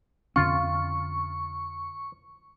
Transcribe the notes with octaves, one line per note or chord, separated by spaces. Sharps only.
F2 D3 C#4 F4 C#6